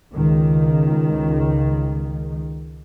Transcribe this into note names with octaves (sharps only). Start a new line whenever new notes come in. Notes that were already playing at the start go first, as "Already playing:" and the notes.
C#2 D#3